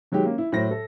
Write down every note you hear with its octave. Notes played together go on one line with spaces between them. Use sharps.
D#3 F#3 G#3 G4
A#3 C#4
E4
A2 F#3 C5 A#6
A4